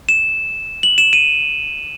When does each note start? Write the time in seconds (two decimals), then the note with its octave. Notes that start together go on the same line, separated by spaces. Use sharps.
0.09 E7
0.83 F#7
0.98 E7
1.13 D#7